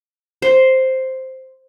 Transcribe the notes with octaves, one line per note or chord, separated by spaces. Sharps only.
C5